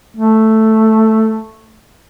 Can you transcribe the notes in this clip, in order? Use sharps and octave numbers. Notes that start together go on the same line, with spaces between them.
A3